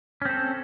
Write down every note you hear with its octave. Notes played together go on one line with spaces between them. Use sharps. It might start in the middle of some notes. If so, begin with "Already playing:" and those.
C4 C#4 A4